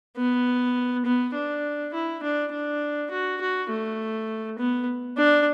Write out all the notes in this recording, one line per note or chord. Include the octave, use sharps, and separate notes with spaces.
B3
B3
D4
E4
D4
D4
F#4
F#4
A3
B3
D4